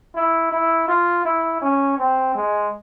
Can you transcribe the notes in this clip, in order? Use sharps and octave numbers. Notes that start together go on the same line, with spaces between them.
E4
E4
F4
E4
C#4
C4
G#3